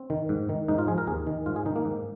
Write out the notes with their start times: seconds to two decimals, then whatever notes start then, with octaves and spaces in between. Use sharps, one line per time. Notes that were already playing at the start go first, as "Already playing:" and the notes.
Already playing: C4
0.10 D#3
0.29 G#2
0.49 D#3
0.68 G#2 D#4
0.78 F4
0.88 F3 G#4
0.98 A#4
1.07 D#2 G#4
1.27 D#3
1.46 G#2 F4
1.56 G#4
1.66 D#3 D#4
1.76 A#3
1.85 G#2